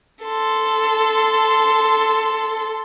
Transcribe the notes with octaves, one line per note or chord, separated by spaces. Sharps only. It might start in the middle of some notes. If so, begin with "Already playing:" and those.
A4 C6